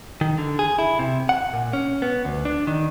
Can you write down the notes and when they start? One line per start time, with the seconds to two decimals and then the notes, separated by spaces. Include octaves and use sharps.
0.21 D#3
0.38 D3
0.59 G#4
0.79 E4
0.99 C3
1.29 F#5
1.53 A#2
1.73 C#4
2.02 B3
2.25 D2
2.45 D4
2.67 D#3